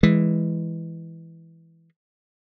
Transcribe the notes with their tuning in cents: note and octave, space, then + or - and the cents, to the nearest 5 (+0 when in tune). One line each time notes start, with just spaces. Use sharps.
E3 +0 G#3 +0